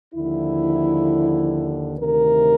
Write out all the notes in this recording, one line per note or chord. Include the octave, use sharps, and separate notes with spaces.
D#2 D3 F3 E4
D2 C3 D#3 A#4